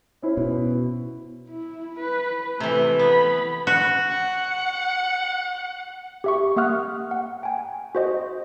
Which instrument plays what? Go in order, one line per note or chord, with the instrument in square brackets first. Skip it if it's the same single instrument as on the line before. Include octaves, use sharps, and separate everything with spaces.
[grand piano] C#4 E4 C5
[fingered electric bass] B2
[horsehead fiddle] E4
B4
[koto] C3 E3 [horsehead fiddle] A3
[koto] B3 [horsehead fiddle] B5
[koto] F#4
[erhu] F#5
[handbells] G4 E5 C#6
A#3 E5 F#5 D#6 F6 F#6
F#5
G5 G#5
F#4 C5 D#5